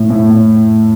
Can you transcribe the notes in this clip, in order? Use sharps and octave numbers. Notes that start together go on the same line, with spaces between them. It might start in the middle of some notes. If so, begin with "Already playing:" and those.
Already playing: A2
A2